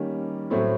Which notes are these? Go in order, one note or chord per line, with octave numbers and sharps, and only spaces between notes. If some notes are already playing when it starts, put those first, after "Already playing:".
Already playing: D#3 G3 A#3 C#4
A2 F#3 A3 C4 E4